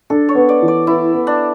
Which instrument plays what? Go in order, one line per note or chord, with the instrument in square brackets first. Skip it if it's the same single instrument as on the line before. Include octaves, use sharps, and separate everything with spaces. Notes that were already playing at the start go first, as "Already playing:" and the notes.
[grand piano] D4 [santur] A4
[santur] C#5
[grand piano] B3
[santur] D5
[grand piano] E3
[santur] D5
[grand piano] B3 [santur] E4
[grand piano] B3
[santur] D4